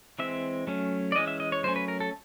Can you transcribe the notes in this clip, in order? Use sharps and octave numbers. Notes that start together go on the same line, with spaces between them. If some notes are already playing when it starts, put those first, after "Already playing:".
E3 G#3 C4 E5
F#3 A3 C#4
D5
E3 G#3 C#4 D#5
E5
D#5
C#5
F#3 A3 C#4 C5
B4
A#4
A4